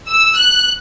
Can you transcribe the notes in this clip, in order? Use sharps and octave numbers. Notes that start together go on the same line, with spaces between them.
E6
F#6